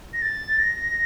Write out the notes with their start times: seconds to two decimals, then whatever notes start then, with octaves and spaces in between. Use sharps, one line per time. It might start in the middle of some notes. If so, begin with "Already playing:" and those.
0.13 A#6
0.22 A6
0.59 A#6